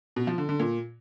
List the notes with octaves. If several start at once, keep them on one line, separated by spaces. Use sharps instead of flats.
B2
F3
D3
D3
A#2